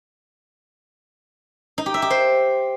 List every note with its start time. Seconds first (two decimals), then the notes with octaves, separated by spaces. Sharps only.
1.78 D#4
1.86 G4
1.94 E5
2.02 G4
2.10 C5